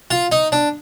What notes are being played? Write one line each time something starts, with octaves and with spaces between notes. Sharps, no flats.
F4
D#4
D4